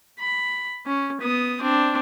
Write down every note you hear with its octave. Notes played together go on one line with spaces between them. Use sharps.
B5
C#4
B3 D#6
C4 D4